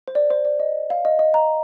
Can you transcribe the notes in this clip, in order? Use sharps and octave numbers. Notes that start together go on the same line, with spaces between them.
C5
D5
C5
D5
D#5
F5
D#5
D#5
A#5